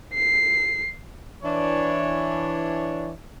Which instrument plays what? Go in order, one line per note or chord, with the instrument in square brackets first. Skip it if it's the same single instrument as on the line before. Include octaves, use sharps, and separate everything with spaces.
[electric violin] C7
[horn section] E3 D4 C#5